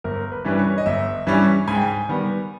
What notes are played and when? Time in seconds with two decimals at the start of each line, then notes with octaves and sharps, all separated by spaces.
0.04 G1 A#4
0.32 B4
0.45 G2 E3 G3 C#4 B4
0.59 C#5
0.78 D#5
0.86 G1 E5
1.27 G2 E3 G3 C#4
1.68 G#2 G#5
1.75 G5
1.82 G#5
2.09 D#3 G3 B3